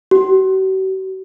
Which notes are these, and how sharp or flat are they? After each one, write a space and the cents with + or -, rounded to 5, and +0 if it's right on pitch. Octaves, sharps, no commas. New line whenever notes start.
F#4 +45